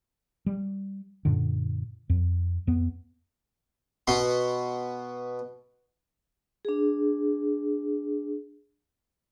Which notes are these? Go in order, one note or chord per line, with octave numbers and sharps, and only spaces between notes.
G3
F#2 A#2 D3
F2
F2 B3
B2 B3 F#4 C6
D4 G#4